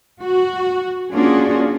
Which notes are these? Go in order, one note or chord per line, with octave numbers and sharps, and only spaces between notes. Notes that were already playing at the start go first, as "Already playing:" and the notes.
F#4
A#3 C#4 D4 F4 F#4 G#4